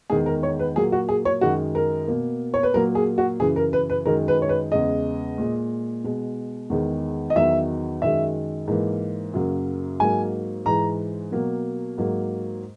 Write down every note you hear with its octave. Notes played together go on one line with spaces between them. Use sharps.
E2 D#3 G#3 G#4
A#4
C#5
B4
A#2 F#3 A#3 G#4
F#4
G#4
C#5
F#2 D#3 G#3 F#4
A#4
B2 A#3
C#5
B4
A#2 F#3 A#3 A#4
G#4
F#4
F#2 C#3 E3 G#4
A#4
B4
B4
F#2 D#3 G#3 A#4
B4
C#5
B4
E2 C#3 G#3 D#5
A#2 G#3
B2 G#3
E2 D#3 G#3
D#5
E2 D#3 F#3 E5
F#2 D#3 G#3 E5
G#2 E3 A#3
F#2 C#3 F#3 A#3
G#2 F#3 A#3 G#5
G#2 E3 G#3 A#5
B2 F#3 A#3
G#2 F#3 A#3